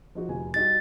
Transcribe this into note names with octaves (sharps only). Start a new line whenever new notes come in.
F3 D#4 F#4
F1 G#5
G3 D#4 F#4 A6